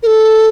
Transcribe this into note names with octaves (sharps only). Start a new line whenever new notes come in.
A#4
A4